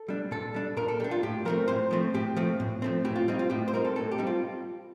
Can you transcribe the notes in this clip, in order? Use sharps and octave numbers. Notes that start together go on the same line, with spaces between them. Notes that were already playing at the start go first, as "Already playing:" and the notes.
Already playing: A4
G3 D4
A#2 A4
G3 D4
A#2 A#4
A4
G3 D4 G4
F4
A2 G4
F3 A3 C4 A#4
A2 C5
F3 A3 C4
A2 G4
F3 A3 C4
A2
F3 A3 C4
A2 G4
F4
G3 C4 D#4
F4
A2 G4
C5
G3 C4 D#4 A#4
A4
A2 A4
G4
G3 C4 D#4
F4